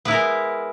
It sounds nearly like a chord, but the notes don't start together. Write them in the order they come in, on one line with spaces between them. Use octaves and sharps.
B3 E4 A#4 G#3